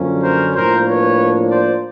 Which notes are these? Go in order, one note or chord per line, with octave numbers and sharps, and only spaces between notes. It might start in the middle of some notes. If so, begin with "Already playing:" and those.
Already playing: F#2 D3 F3 A#3 C#4
A#4 C5
A2 F3 A#3 D4 A#4 C5
B4 C#5
C5 D5